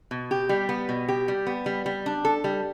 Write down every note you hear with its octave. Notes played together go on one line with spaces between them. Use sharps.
B2
G4
G3
B3
B2
G4
G3
B3
G3
G3
D4
A4
G3